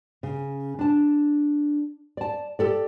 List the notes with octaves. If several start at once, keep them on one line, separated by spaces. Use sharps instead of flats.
C#3
D4 A5
D5 A5
G4 A4 D5